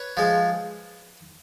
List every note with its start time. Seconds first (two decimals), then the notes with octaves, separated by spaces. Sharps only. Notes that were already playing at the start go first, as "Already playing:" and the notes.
Already playing: B4 C#5
0.17 F3 G#3